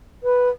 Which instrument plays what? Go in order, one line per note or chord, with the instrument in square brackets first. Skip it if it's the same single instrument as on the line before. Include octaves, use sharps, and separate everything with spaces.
[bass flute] B4